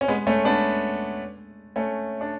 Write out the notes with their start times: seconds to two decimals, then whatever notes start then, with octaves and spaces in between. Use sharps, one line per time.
0.01 C#4
0.08 G#3 B3
0.27 A3 C#4
0.45 B3 D4
1.76 A3 C#4
2.21 D4